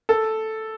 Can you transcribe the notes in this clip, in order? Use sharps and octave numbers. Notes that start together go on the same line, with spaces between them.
A4